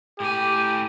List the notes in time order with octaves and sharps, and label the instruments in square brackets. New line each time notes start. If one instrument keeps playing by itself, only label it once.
[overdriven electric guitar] A2 G#5 [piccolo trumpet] G4